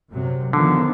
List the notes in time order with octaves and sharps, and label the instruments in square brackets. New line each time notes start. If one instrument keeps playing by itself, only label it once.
[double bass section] F#2 C3 F#3
[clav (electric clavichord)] D3 [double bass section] D#3 F3 B3